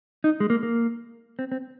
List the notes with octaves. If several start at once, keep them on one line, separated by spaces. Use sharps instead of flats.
D#4
G#3
A#3
A#3
C4
C4